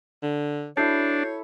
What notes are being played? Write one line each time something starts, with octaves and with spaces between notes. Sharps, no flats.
D3
D4 E4 F#4 A4 C#5 G6 C7